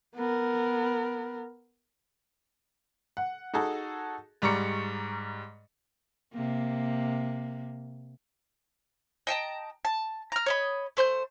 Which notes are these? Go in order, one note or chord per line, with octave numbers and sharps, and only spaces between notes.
B3 A#4
F#5
D#4 F#4 G#4 A4
G#2 G3 D5 A#5 C#6 C#7
C3 A#3
D#5 G5 A5 A#5
A5
A#5 F6
C#5 D#5 B5
A3 C5 G#5 G6